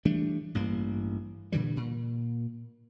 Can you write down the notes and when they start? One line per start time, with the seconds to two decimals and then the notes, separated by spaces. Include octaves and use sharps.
0.05 E3 G3 A3 D4
0.55 A1 G2 A#3
1.52 A#2 D3 E3 G3
1.76 A#2